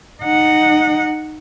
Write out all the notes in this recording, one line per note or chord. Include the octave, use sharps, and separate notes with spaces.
D#4 F#5